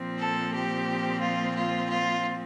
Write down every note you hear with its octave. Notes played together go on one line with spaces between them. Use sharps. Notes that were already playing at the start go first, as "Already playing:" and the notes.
Already playing: A#2 F3 C4
A4
G4
F4
F4
F4